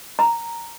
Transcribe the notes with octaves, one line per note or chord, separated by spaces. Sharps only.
A#5